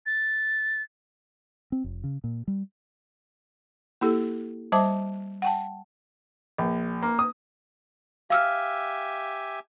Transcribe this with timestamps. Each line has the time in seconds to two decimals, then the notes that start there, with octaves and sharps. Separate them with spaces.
0.06 A6
1.72 C4
1.84 F1
2.04 C#3
2.24 A#2
2.48 G3
4.01 A#3 E4 G4 A4
4.72 G3 C5 E5 A5 D6
5.42 F#5 G5 A5
6.58 A#1
7.02 A#3
7.19 D#6
8.30 G4 E5 F5 G#5 E6 F6